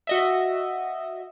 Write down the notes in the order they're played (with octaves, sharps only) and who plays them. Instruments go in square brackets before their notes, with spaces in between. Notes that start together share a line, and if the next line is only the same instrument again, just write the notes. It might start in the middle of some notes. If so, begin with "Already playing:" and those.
[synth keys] F#4 D#5 E5